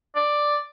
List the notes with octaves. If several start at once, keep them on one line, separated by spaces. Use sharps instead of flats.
D5